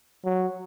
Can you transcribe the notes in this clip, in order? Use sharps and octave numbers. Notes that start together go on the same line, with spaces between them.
F#3